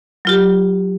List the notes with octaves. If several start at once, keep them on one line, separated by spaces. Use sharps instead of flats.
F#3 F4 G4